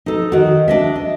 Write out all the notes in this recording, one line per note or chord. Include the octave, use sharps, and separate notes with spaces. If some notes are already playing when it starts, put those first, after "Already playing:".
D#4 A4
D#3 F#4
D4 D#5 E5
D#5